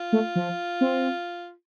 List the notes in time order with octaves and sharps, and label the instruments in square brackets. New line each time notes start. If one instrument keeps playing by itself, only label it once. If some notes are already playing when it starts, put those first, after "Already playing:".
Already playing: [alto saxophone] F4
[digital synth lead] A3
F3
C4